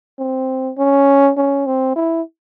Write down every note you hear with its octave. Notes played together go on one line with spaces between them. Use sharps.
C4
C#4
C#4
C4
E4